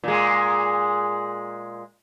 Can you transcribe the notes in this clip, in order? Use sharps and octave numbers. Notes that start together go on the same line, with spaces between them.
A#2 G#3